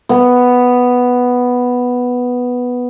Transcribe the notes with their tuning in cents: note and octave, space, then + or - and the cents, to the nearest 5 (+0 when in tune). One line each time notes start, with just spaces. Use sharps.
B3 +0